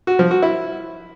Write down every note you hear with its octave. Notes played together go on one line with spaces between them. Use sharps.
F#4
F3
F#4
E4